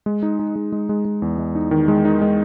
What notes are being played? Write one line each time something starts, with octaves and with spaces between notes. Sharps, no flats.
G#3
D#4
D#4
G#3
G#3
G#3
G#3
E2
G#3
D#4
D#3
G#3
D#4
G#3